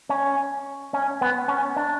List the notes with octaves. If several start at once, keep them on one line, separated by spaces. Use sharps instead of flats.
C#4
C#4
B3
C#4
D4